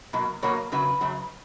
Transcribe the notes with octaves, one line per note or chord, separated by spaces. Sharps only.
B2 F#3 A#3
B2 F#3 A#3 C#5
F#2 C#3 F#3 B4
F#2 C#3 F#3